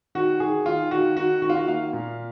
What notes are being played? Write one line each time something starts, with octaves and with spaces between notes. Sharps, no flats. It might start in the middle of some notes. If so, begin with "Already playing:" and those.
D#3 F#4
D#3 G#4
D#3 F4
D#3 F#4
D#3 F#4
D#3 F#4
F4
F#4
A#3 F5
A#2